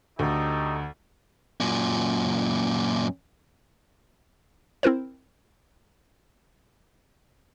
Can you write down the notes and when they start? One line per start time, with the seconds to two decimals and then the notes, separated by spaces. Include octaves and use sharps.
0.19 D2 D#4 G4 A4
1.60 F#2 A#2
4.83 C4 E4 A#4 C5